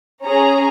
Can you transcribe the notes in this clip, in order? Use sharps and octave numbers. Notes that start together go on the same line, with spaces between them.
C#4 G#4 A#5